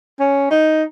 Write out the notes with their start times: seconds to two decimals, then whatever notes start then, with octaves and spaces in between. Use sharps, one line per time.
0.19 C#4
0.50 D#4